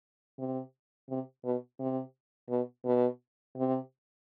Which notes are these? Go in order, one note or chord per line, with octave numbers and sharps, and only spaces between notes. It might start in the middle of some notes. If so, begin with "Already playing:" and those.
C3
C3
B2
C3
B2
B2
C3